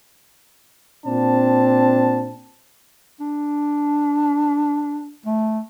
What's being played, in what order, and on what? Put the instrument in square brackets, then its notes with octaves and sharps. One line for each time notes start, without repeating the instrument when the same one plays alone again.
[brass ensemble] A#2 C4 D4 A5
[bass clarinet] D4
A3